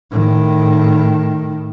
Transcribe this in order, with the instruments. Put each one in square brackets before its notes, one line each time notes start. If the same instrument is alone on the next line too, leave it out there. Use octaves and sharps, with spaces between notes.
[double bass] A2 D#3